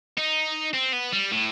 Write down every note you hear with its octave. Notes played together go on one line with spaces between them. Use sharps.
D#4
C4
B3
G3
A2